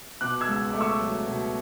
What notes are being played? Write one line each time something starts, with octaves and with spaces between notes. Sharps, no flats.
B2 D6 F#6
E6 G#6
C#2
A3 D6
C#6 E6
F#3
B2